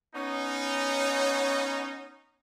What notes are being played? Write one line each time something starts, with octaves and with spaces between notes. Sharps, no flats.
B3 C#4 D#4